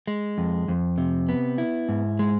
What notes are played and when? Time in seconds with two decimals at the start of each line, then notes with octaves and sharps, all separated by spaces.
0.07 G#3
0.38 F2
0.68 F2
0.98 C3
1.29 B3
1.58 E4
1.89 G#2
2.19 G#3